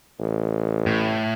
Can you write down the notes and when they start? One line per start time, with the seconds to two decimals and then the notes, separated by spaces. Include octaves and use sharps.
0.19 A1
0.86 A2